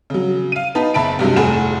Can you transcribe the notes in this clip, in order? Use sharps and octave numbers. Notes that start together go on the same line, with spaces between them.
C#3 F#3
F5 D#7
B3 D#4 B4 A5
F#1 E5 A5 B5 D7
G2 C3 F#3 G#3
F1 A2 G#4 A4 F#5 E7